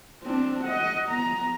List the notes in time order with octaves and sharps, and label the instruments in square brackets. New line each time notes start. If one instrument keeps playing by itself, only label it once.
[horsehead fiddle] C4 D4
D#5 F#5
B3 A#5